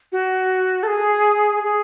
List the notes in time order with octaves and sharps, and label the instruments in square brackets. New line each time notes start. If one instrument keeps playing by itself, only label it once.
[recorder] F#4
A4
G#4
G#4